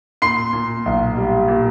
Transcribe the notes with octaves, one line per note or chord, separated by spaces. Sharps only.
A#2 C6 C7
A#2
B1
G3
A#2